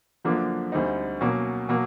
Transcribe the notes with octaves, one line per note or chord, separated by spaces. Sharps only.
F#2 D3 F3 A#3 D4
D2 D3 G3 C4 D#4
B2 F#3 A#3 C#4
B2 F#3 A#3